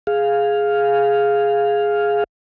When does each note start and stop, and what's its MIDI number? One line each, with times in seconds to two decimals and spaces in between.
0.07 2.24 68
0.07 2.24 77